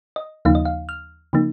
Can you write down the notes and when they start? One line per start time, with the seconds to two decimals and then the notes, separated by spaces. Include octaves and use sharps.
0.16 D#5
0.45 D#2 C#3 F3 A#3 D#4 F5
0.55 D#5
0.65 F5
0.89 F6
1.33 C#3 F3 A#3 D#4